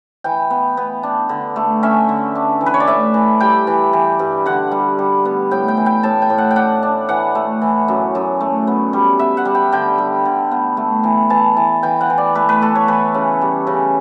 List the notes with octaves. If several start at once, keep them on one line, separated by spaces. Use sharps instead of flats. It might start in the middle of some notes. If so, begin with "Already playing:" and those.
E3 G5
B3
B3
D4
D3
A3
C#4 E5
D3
D4
E3
B4
C#5
D5
A2 E5
E3
G3 G5
E3
E3
G2
D3 F#5
G3
G3
B3
A2 G5
G5
E3
G5
A2 A5
G5
A2
F#5
G5
D4 F#5
D4
E3 F#5
A3
E3
F#2
F#2
A3
B3
G3
B3 E5
F#5
G3
G5
D3 G5
G3
D3
B3
A3
E3
E3 A5
E3
E3 G5
F#5
E3
D5
A3 B4
B4
A3 A4
C#5
E3 B4
C#3
G3
C#3